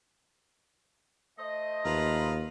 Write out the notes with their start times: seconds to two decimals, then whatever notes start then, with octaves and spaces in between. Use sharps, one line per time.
1.39 A3 C5 D#5
1.85 D#2 F4 B4 A#5